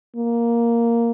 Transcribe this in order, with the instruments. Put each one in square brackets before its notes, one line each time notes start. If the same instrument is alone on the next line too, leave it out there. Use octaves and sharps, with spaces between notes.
[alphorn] A#3